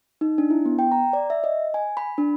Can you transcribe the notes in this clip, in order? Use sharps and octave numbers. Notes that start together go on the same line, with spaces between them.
D#4
D4
E4
B3
G5
A#5
D5
E5
D#5
G#5
B5
D4